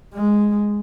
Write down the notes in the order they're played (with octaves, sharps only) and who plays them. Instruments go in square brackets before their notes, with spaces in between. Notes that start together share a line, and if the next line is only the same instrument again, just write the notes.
[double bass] G#3